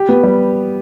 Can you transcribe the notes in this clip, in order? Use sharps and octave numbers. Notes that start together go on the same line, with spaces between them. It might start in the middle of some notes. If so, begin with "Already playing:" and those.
Already playing: G4
B3
G3